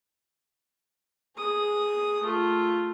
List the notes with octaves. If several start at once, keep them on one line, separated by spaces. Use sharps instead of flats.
G#4 D#6
A3 F4